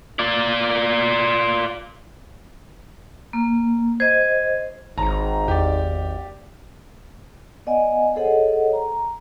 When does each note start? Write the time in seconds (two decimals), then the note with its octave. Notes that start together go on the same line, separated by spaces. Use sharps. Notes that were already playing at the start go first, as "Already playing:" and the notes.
0.19 F4 D5
3.33 A#3
4.00 C5 D#5 G#6
4.98 G#1 G#2 C#5 A5 A#5 C6
5.48 E2 G4 D5
7.66 B3 D5 D#5 F#5 G#5
8.16 G#4 A4 C5 C#5 D#5 F#5
8.73 A#5